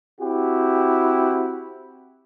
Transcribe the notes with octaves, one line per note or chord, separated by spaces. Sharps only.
C4 E4 F#4 G4